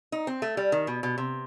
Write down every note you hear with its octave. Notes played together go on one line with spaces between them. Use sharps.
D#4
C4
A3
G3
D#3
B2
B2
C3